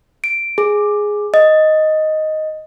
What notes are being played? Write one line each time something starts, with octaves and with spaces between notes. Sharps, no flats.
D7
G#4
D#5